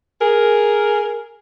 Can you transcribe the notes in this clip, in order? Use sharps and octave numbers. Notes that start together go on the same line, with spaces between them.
G#4 A#4